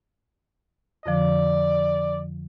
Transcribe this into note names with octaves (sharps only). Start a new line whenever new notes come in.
F2 D3 F3 D5